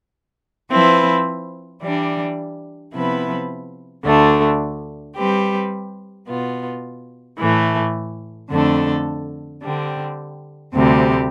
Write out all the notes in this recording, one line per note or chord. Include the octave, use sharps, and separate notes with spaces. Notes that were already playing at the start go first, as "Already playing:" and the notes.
F3 C4 E4 B4
E3 G3 D4
C3 F3 B3 E4 B4
D2 D3 A3 D4
G3 C4 G4 B4
B2 B3 F4
A2 E3 A3
F2 D3 A3 D4 A4
D3 G3 C4
D2 C3 G3 C4 G4